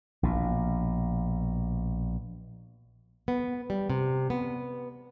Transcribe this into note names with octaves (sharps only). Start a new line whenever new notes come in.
A#1 B2
B3
G3
C3
B3